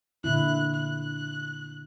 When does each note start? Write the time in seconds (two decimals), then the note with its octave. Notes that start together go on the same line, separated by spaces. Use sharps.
0.24 A#2 D3 E4 F#6
0.74 F#6